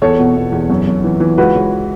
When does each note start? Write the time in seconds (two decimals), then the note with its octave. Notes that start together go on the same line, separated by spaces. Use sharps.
0.02 E2 A4 C#5
0.19 B2
0.36 B2
0.52 E2
0.70 F#2
0.87 F#2
1.04 E3
1.20 E3
1.38 C#2 F#4 B4
1.55 C#2